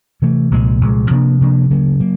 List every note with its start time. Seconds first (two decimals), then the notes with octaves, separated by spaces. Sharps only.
0.22 C3 E3 A3
0.51 C2 A#2 F3 G#3
0.81 C2 A#2 F3 G#3
1.10 C3 F3 A#3 D4
1.41 C3 F3 A#3 D4
1.70 D2 C#3 F#3 A#3
2.00 C#3 F#3 A#3